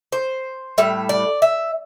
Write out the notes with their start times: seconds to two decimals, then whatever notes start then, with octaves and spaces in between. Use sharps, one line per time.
0.12 C5
0.78 A2 G3 E5
1.09 D5
1.42 E5